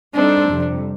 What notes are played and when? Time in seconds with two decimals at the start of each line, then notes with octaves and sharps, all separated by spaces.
0.14 G3 C4 D4 D#4 A4 C5
0.48 F2 C3 G3